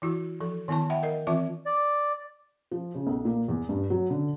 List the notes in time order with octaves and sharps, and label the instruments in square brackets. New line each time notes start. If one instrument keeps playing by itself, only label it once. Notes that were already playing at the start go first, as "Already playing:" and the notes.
[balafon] E3 E4 F#4
F3 A4
D#3 B3 E4 A5 C#6
E5 F#5 G5 B5
A#4 D#5
E3 C4 F4 E5 C#6
[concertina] D5
[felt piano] F3
C#3
B1
A#2
E2
G2
F#3
D3